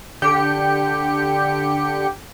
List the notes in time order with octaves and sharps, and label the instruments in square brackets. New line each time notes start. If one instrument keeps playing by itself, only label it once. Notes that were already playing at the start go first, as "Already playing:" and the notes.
[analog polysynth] D3 G4 G5 C#7